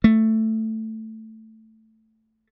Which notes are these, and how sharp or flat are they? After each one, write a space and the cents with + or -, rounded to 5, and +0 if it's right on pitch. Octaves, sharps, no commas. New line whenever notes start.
A3 +5